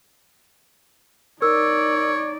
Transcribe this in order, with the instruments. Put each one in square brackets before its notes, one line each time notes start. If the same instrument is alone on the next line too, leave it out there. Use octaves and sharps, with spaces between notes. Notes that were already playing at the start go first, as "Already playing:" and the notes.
[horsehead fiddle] D#4 D5 [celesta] A#4 E6 [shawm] C#5